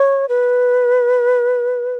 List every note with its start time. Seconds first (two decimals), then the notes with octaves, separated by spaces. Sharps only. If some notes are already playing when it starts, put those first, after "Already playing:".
Already playing: C#5
0.29 B4